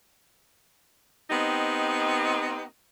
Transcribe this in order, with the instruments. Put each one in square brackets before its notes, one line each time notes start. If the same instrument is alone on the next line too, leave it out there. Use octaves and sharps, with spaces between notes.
[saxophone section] B3 C4 D#4 G4 D#5